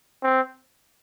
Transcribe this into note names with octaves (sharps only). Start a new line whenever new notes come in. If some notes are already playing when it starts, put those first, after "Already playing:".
C4